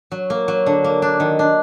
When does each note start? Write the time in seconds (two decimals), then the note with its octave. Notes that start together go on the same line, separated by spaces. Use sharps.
0.12 F#3
0.30 A#3
0.48 F#3
0.66 D3
0.84 A#3
1.02 D4
1.20 D#3
1.39 D4